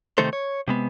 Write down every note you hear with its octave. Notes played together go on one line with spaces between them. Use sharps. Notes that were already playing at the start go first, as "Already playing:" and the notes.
C3 D#3 A3 D#4 A4 C5
C#5
C3 G#3 B3